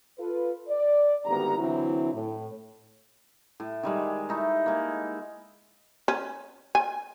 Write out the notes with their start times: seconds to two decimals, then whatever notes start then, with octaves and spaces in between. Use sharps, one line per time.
0.18 F4 A4 B4
0.68 D5
1.25 G#1 D2 G2 B3 G4 A#5
1.57 D3 E3 F#3 C4 E4
2.13 A2
3.60 A2
3.83 D#3 G3 G#3
4.29 A3 D#4 E4
4.66 G#3 A#3
6.08 C#4
6.75 G#5